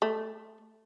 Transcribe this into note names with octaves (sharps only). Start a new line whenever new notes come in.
A3